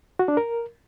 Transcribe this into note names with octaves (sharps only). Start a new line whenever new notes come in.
F#4
D4
A#4